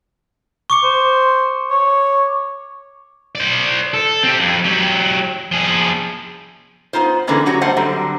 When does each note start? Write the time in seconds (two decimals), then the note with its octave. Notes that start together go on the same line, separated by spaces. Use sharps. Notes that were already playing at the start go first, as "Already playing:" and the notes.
0.70 C#6 D6 C#7
0.84 C5
1.70 C#5
3.35 C5 D5
3.94 A4
4.23 C4 G4
4.40 F2
4.64 F#3 G4
5.52 F3 G#4
6.93 B3 D#4 F4 C5
7.27 D3 E3 G#3 A#3 B3 C#4
7.46 F#3 C#4 F#4 G4 C#5
7.61 G3 A3 B3 C5 F#5
7.76 D3 F#3 G3 C4